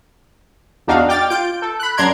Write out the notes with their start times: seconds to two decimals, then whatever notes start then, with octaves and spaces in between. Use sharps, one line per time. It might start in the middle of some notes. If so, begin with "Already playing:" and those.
0.87 E2 D4 D#4 F#4 F5
1.09 G5 D6 F6 A6
1.30 F4 G6 D7
1.62 A4
1.80 B5 F#6
1.97 F#2 D4 A#5 C6 G#6 D7